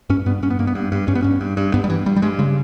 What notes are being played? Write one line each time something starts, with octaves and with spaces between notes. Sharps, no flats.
G2 C#4
G2 B3
G2 C#4
B3
G2 A#3
B3
G2
G2
G2 C#4
B3
G2 C#4
G2
G2
G2 B3
G3
G2 E3
G2 G3
G3
G2 G#3
C#3 G#3